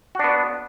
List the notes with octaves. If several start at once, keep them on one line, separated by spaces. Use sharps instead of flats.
B3 D4 F#4